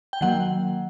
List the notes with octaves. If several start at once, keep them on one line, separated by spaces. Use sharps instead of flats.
G5
D#3 F#3 A#3 F#5